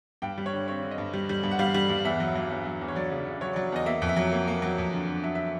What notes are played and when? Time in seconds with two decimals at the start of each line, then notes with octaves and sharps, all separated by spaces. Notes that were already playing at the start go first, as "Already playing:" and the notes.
0.22 G2 G5
0.38 G3
0.46 C#5
0.53 D3
0.68 C4 C#5
0.83 D3
0.91 D#5
0.98 G2
1.13 G3
1.29 G3
1.43 G2
1.51 F#5
1.59 G3 F5
1.74 G3
1.89 G2
2.04 E2 E5
2.20 F#3
2.36 F#3
2.50 E2
2.66 F#3
2.81 E2
2.88 C#5
2.96 F#3 D5
3.11 C#3
3.26 C#3
3.41 F#3 C#5
3.53 D5
3.56 F#3
3.72 E2 D#5
3.86 A#3 E5
4.02 F2
4.09 E5
4.16 F#3
4.32 A#3
4.48 A#3
4.62 F#3
4.78 F2
4.93 D3
5.08 D3
5.23 F#3 E5
5.35 E5